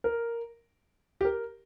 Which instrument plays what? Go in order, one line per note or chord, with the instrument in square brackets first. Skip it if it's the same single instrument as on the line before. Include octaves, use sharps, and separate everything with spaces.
[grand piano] A#4
G4
A#4